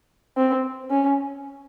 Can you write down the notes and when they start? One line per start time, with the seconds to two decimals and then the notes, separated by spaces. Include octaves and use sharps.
0.37 C4
0.90 C#4